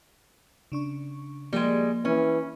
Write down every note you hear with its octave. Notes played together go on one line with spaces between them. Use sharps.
C#3 D4 C#6
F3 G3 G#3 A#3 G#4
E3 C#4